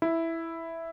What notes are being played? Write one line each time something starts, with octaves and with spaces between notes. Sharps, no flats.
E4